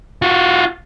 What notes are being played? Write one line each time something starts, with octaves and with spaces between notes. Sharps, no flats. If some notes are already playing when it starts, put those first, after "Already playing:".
F4 F#4